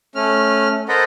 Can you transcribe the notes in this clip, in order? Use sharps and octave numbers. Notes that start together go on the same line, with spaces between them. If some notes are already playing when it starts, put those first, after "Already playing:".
A3 C#4 F6
A4 A#4 C5 D#5 F#5 B5